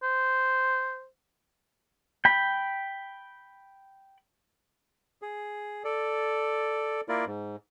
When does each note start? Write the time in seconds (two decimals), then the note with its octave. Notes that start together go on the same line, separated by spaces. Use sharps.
0.03 C5
2.25 G5 B5
5.22 G#4
5.84 A4 D5
7.09 A#3 E4 F4 A#4 D5
7.26 G#2